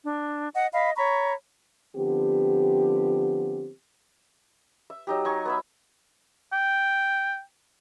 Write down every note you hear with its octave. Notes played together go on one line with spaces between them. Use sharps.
D4
D#5 F#5
D#5 F5 B5
C#5 A#5 B5 C#6
D3 F3 B3 C4 G4
E5
F#3 D#4 G4
D#4 G#5 C#6
B3 B4 E5
G5